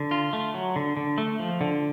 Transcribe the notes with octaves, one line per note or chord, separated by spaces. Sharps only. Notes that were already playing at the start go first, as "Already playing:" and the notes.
Already playing: D3
F4
A3
F#3
D3
D3
A3
F3
D3